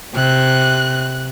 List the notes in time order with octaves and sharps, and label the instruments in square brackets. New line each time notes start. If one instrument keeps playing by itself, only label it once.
[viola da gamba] C3 [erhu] F#6